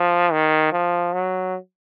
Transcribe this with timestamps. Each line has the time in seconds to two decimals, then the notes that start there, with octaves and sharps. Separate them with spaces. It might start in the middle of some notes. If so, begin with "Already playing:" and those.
Already playing: F3
0.32 D#3
0.72 F3
1.13 F#3